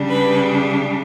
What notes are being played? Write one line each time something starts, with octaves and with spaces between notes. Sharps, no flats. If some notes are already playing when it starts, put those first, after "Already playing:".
Already playing: C#3 G3 D4
B4